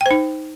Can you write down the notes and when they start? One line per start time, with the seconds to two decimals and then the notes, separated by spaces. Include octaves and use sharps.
0.01 G5
0.06 C5
0.11 D#4